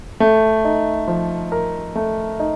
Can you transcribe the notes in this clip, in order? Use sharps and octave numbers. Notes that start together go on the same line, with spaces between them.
A3
D#4
F3
A#4
A3
D#4